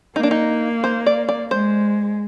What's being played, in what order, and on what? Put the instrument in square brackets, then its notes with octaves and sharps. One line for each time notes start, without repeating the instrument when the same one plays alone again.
[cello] A#3 [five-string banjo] D#4
[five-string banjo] D4
D#4
C5
D5
D5
[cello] G#3 [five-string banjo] C5